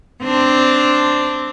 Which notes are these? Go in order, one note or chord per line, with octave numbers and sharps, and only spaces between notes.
C4 D4